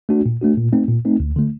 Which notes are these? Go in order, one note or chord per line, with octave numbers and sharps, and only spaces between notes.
A3 D4 F#4
A#2
A3 D4 F#4
A#2
A3 C4 D#4
A#2
A3 C4 D#4
D2
D3 A3